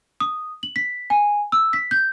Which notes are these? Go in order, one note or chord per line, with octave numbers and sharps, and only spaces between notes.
D#6
F#7
B6
G#5
E6
B6
G6